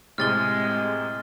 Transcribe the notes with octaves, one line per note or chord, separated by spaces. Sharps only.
A2 C3 G#3 F6 A6 G7